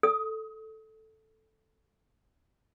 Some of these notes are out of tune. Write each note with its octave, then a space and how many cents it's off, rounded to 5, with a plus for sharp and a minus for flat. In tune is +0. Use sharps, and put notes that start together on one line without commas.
A4 +0 D#6 +35